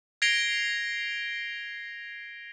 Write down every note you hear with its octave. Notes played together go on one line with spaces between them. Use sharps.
G#6 A#6 C7 D7 F7 G7